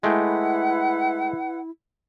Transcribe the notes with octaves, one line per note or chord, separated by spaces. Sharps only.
G#3 A3 E4 B4 F#5 G5